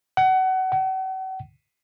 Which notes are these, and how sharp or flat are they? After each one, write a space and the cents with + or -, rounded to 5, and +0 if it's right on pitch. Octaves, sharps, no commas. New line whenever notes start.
F#5 +25
F#5 +40